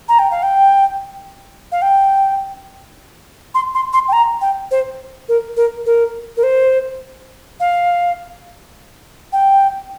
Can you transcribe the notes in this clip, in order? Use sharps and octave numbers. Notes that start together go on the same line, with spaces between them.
A#5
G5
F5
G5
F5
G5
C6
C6
C6
G5
A#5
G5
C5
A#4
A#4
A#4
A#4
C5
F5
G5